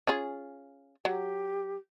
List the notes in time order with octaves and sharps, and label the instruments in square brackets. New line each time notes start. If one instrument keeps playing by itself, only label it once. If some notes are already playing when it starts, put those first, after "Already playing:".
[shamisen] C#4 F4 G#4
[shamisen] F#3 [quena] G4